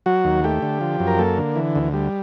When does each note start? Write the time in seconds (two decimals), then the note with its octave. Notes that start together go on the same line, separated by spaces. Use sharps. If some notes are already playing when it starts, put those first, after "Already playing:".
0.06 F#3 F#4
0.25 D#2
0.44 A3 G4
0.62 D3
0.81 F3
1.00 F#2
1.07 A#4
1.19 A#3 A4
1.37 D3
1.56 E3
1.75 D2
1.94 G3